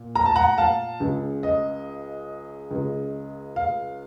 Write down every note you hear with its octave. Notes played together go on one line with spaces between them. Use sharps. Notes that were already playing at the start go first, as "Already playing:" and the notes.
Already playing: A#2
A#5
A5
F#5 A#5
F5 A5
C#2 C#3
D#5
C#2 C#3
F5